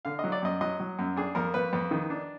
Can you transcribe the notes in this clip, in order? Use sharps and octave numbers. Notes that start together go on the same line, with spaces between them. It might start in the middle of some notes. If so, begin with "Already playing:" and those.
D3 F5
F#3 D#5
D5
F#2 D#5
F#3 D#5
F#3
F#2
D4 G#4
F2 A#4
F2 B4
F2
D#3
D4